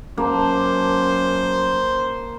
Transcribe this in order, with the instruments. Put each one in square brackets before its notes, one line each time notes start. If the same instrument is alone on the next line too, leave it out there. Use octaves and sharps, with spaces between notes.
[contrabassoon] F#2 [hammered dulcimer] A#3 A5 [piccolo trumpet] C5